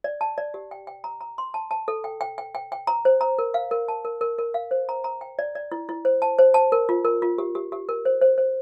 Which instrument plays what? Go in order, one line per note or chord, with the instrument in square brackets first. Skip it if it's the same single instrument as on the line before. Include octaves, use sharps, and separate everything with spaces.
[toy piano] D5
A5
D5
G4
G5
G5
A#5
A#5
C6
A5
A5
A4
G5
G5
G5
G5
G5
A#5
C5
A#5
A#4
F5
A#4
A5
A#4
A#4
A#4
F5
C5
A#5
A#5
G5
D5
D5
E4
E4
C5
A5
C5
A5
A#4
F4
A#4
F4
G4
G4
G4
A#4
C5
C5
C5